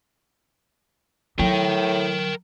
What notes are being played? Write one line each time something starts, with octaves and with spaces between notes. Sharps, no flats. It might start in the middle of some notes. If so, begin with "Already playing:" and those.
A2 F#3 A#4 G5